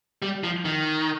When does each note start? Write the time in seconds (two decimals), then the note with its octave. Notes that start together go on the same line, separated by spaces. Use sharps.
0.22 G3
0.44 F3
0.65 D#3